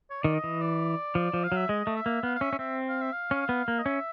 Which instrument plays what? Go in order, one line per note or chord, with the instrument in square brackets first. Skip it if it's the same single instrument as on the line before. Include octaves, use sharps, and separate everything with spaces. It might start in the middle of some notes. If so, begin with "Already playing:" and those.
[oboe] C#5
[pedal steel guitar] D#3 [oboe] D5
[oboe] D#5
[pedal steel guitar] E3
[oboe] D5
[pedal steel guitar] F3
F3
[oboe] F5
[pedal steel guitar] F#3 [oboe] E5
[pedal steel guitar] G#3 [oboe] D#5
[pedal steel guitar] A3
[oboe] E5
[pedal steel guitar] A#3
[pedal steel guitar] B3 [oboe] F5
[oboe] F5
[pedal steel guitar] C#4 [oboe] E5
[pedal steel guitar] C#4
[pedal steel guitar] C4 [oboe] E5
[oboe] F5
E5
F5
[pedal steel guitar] C#4
B3
A#3
[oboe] D#5
[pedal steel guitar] C#4 [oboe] E5